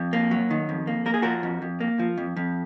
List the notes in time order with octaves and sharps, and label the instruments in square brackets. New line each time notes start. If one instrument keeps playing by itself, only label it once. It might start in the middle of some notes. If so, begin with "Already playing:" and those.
Already playing: [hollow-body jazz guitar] F2
A#3
F#3
D#3
F2
A#3
A#3 A#4
G#4
F3 F#4 A#4
F2
F2
A#3
F3
F2
F2